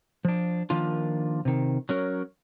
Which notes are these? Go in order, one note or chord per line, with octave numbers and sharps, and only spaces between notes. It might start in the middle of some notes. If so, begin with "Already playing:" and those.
F3 D4
D#3 F3 A#3 D4 F4
C3 D#3
F#3 C#4 A#4